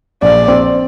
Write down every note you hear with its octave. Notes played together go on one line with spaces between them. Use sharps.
A#1 D5
C4